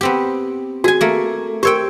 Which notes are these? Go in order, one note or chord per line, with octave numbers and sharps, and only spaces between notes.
B3 C4 G4
F#4 G#4 G#5
A3 A#3
G4 A#4 C5 C#5 G5